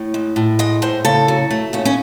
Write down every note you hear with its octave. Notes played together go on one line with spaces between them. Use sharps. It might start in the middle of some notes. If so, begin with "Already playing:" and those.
Already playing: A2
G#3
A2
G#3 D#5
A2 C5
C#3 A4
F#3
A3
D#2 C#4
C#4